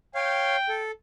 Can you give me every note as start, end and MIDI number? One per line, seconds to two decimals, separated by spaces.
0.15 0.56 73
0.15 0.56 77
0.15 0.81 79
0.69 0.91 69